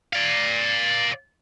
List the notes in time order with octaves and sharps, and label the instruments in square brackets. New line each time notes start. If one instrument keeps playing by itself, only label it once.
[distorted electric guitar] D5 F5